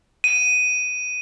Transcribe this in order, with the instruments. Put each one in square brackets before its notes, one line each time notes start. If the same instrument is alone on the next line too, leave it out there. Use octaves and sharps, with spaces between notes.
[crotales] D#7